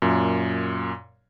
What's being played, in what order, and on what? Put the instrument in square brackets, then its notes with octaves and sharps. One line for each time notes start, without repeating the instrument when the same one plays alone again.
[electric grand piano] F#2 A#2